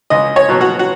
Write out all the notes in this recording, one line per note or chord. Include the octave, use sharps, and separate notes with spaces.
C#2 D#5
C#5
B2 F#3
F#4
F#4